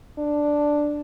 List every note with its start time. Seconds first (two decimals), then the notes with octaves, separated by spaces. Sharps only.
0.19 D4